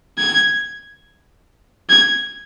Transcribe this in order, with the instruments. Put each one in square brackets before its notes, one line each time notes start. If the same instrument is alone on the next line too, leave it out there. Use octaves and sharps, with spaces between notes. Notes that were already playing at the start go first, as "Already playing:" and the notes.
[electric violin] G#6
G#6